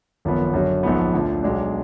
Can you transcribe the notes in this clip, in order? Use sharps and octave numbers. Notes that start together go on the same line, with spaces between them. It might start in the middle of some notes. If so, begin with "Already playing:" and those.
G#1 F#2 F3 B3
F#2 D3 F#3
A#1 G#2 F3 B3
D2 D3 F3
B1 B2 G#3 D4